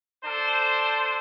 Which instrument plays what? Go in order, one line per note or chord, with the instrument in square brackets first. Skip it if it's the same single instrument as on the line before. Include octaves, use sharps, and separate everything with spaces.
[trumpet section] D4 A4 C5